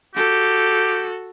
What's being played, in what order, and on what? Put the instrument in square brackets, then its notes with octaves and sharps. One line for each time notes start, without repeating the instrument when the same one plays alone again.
[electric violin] F#4 A4 [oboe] G4